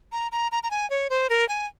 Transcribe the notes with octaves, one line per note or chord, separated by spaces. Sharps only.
A#5
A#5
A#5
A#5
G#5
C#5
C5
A#4
G#5